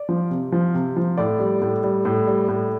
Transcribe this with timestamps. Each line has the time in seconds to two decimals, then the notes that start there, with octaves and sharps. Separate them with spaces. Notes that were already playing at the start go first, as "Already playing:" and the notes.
Already playing: D5
0.09 F3
0.31 C3
0.52 F3
0.74 C3
0.96 F3
1.17 A2 D5
1.39 G3
1.62 A2
1.84 G3
2.05 A2
2.27 G3
2.48 A2